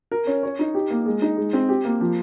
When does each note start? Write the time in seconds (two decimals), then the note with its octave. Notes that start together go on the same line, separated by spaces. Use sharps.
0.11 A#4
0.27 C#4
0.43 C#5
0.59 D#4
0.74 G4
0.91 A#3
1.06 G#3
1.22 D#4
1.37 G#3
1.53 C4
1.69 G4
1.85 A#3
2.01 F3